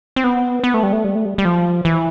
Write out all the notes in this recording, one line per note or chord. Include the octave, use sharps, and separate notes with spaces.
C4
B3
B3
A3
G3
A3
G3
A3
G3
G3
F3
E3